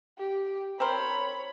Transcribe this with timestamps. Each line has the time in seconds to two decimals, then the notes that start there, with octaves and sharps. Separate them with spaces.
0.19 G4
0.80 C4 A#4 C5 C#5 B5